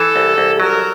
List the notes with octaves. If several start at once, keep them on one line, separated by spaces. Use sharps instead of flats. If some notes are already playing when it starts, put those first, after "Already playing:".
Already playing: E3 A4
C2
C2
F#3 A#4